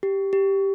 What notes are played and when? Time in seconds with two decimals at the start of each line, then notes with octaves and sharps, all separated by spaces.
0.03 G4
0.33 G4